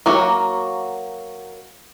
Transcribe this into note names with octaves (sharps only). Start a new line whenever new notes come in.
F#3 A#3 F#4